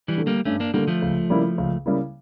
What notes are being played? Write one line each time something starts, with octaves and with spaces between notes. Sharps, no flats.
E3 G3
D3 A3
G3 A#3
G2 A3 C#4
A#3 D4
D3 G3 A3 A#3
F3 A3
C#2
C#3 G3 A#3 E4
C#2
C#3 G3 A#3 E4